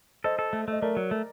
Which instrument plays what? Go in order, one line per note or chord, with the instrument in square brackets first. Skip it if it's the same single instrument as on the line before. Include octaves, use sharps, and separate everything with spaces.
[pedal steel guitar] A4 [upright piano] C5 D#5
[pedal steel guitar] A4
A3
[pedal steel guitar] A3 [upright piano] D#5
[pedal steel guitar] A3 [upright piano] A#4 D5
[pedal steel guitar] F#3
A3